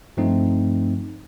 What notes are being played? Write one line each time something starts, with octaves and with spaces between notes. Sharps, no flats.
G2 F3 A3 C4 D#4